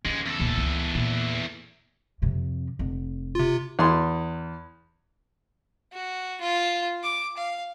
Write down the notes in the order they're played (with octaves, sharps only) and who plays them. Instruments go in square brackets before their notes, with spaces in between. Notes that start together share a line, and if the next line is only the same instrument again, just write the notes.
[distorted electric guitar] D#2 G#3 [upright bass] C#4
[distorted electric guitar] E2 A4
[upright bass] D#1 D2
C#2
A#2
F2 C3
F1
[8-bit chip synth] C3 F4
[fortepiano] E2 C6
[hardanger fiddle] F#4
F4
D6
F5